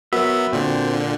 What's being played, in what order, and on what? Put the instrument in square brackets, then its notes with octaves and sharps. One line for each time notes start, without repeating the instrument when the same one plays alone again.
[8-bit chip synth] F#3 B3 [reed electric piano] F#4 A#4 [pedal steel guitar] E5
[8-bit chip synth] A#2 D3 [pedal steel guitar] C4